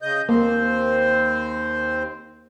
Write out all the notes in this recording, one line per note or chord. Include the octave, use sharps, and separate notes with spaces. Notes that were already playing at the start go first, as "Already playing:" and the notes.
C#3 D#5 G6
D#2 A#3 C4 C5